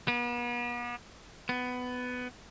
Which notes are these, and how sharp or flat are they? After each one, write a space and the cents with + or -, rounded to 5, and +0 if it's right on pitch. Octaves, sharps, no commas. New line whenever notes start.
B3 -40
B3 +15